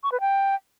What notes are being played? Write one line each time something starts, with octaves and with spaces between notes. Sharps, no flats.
C#6
B4
G5